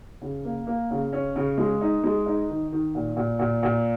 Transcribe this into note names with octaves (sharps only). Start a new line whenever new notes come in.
C#3
A#3
A#3
C#3
C#4
C#3
G#3
D#4
G#3
D#4
D#3
D#3
A#2
A#2
A#2
A#2